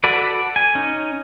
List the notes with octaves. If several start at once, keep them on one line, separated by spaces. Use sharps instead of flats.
F#4 A4 B4 D5
G#5
C#4 D#4